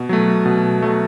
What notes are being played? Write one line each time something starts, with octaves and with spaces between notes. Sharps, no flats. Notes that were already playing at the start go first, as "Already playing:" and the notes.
Already playing: B2
F#3 A3
B2
F#3 A3